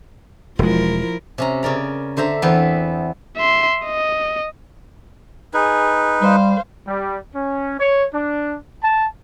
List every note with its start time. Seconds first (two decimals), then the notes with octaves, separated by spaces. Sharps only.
0.59 E1 F3 G#3 E4 A#4
1.38 C3 C#4 A#5
1.63 C#3 A#4 D5 A#5
2.17 D3 C5 E5 A#5
2.42 E2 B3 C4 B4 C5
3.37 E5 C6
3.85 D#5
5.54 D#4 G#4 B4
6.22 G3 C5 F5
6.87 G3
7.34 C#4
7.80 C#5
8.13 D4
8.84 A5